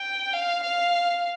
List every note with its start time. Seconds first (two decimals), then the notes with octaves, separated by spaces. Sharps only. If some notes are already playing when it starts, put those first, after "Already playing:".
Already playing: G5
0.33 F5
0.63 F5